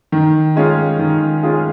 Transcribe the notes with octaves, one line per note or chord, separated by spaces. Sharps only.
D#3
G#3 C#4 F4 G#4
D#3
G#3 C#4 F4 G#4